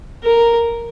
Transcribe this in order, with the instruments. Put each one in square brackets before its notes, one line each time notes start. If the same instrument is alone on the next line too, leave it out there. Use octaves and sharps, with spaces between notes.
[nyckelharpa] A#4